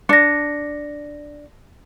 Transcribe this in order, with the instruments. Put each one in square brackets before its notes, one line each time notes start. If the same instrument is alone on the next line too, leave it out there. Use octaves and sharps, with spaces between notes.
[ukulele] D4 [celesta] A#6 C#7